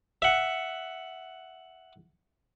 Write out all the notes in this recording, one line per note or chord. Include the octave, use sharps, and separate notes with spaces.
E5 F#5